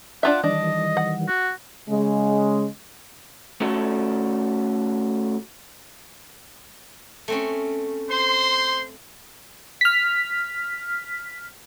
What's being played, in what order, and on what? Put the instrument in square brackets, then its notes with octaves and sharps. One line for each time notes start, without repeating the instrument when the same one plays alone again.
[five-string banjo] D4 F4 E5 [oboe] F#5
[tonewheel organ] D#3 E3 G3 [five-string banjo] D4 [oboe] D#5
[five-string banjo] F#5
[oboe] F#4
[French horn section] C#3 G#3
[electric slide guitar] A3 C#4 F#4 A4
[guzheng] A3 C4 C#4
[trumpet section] C5 C6
[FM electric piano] F6 B6